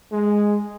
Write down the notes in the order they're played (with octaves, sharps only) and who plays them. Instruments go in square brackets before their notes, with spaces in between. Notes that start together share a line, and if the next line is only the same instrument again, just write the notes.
[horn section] G#3